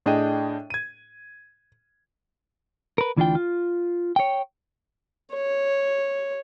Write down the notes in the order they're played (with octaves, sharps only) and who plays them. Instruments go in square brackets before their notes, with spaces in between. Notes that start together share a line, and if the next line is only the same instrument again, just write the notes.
[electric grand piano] A2 D4 G#4 D#5 G5 D#7
G#6 D#7
[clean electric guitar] A#4 B4
D2 E3 C#4 D4 F4 G5
F4
C#5 G5
[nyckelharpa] C#5